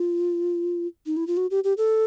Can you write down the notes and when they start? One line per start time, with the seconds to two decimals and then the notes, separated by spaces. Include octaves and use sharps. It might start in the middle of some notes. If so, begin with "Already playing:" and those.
Already playing: F4
1.06 D#4
1.17 E4
1.27 F4
1.37 F#4
1.51 G4
1.64 G4
1.77 A4